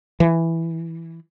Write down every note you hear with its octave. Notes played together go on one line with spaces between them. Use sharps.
E3